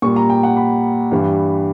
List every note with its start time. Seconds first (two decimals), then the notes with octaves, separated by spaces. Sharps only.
0.02 A#2 G3 C#6
0.16 A#5
0.30 G5
0.43 F#5
0.57 B5
1.11 G2 E3 G3